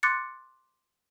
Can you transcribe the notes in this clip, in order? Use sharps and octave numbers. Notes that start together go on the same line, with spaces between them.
C6 D6 F#6 A6 C#7